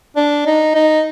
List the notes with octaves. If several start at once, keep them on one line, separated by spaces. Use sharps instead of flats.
D4
D#4
D#4